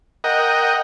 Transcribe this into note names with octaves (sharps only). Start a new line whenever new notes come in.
A#4 D#5 F#5 G5